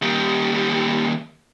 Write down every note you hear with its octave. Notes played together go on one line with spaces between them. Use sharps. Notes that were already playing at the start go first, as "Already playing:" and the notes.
D#2 G3